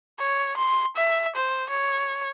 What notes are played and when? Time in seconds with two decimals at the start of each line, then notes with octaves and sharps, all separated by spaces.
0.20 C#5
0.57 C6
0.97 E5
1.36 C5
1.70 C#5